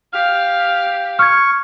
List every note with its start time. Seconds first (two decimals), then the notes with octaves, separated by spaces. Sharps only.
0.13 G4 F5 F6
1.19 C#6 F6 G#6